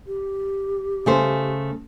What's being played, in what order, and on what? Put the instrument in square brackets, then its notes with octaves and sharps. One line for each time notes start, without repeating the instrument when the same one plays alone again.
[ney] G4
[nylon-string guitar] C#3 A3 C5